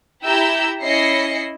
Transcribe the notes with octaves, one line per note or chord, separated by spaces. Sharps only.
E4 G4 E5 A#5 E6 G6
C#4 E4 D#5 A#6 C7 C#7